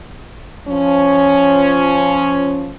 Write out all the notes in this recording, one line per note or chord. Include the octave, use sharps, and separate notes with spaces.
F3 C#4